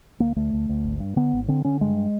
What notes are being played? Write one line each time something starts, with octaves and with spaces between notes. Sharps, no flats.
D2 A#3
D2 A3
D2
D2
G#1
G2
D3 B3
G#1
D3 C4
D3 C#4
G2 G#3